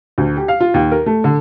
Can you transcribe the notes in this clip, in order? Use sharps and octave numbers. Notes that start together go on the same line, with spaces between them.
D2
G4
F5
F4
D#2
A#4
A3
D3